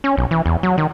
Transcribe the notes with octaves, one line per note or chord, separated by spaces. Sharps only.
C#4
B1
E3
E2
F#3
D#3